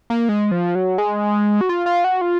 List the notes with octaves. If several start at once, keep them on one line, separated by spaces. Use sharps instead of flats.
A#3
G#3
F3
F#3
G#3
F#4
F4
F4
F#4
F4